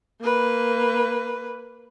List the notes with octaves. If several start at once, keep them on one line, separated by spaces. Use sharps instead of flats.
A#3 B4